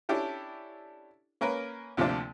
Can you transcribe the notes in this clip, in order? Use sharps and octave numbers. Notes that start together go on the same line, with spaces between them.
C#4 D4 E4 G4 A4
A#3 C#4 A#4 B4
D2 C3 F3 A#3 D4